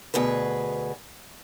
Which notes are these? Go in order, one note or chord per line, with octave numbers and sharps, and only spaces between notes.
D2 B2 G#4 B4